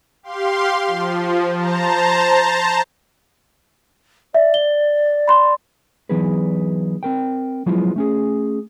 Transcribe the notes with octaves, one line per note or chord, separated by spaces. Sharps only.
G4 F5 C6
F3
C5 A5 A#5
D5 E5
G7
B5 C6
E3 F#3 B3 D#4 G#4 B4
C4 A#4 G5
F3 F#3 G#3 B3 E4 F4
A3 C#4 G#4